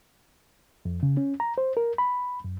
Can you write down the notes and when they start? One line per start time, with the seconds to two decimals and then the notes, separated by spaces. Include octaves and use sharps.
0.85 F2
1.03 C#3
1.17 C#4
1.40 A#5
1.58 C5
1.77 A#4
1.98 B5
2.44 F#2